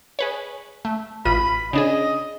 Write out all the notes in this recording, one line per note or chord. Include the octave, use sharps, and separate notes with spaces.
G#4 B4 C#5
A3
A1 F4 B5 D#7
C#3 D4 G#4 D#5